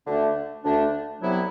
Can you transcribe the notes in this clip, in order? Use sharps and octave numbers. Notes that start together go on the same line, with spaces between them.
D2 D3 A3 D4
D2 D3 A3 D4
C2 C3 F#3 B3 E4